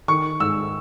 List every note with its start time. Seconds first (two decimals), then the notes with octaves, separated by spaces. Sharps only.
0.08 D#3 C#6
0.40 G#2 E6